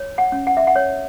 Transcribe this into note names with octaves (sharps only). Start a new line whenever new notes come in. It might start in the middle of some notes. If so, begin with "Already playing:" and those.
Already playing: C#5
F#5
C#4
F#5
E5
F#5
C#5